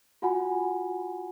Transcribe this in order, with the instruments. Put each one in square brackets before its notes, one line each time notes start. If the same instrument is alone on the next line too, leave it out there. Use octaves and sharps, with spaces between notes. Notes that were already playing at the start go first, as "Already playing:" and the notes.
[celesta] F4 F#4 F#5 G#5 B5